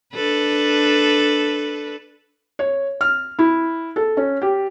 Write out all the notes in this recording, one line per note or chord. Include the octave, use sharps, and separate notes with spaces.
D4 A4 B4
C#5
F6
E4
A4
C#4
G4